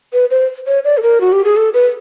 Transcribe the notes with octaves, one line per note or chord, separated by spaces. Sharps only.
B4
C5
C#5
D5
A4
A#4
F#4
G4
G#4
A4
B4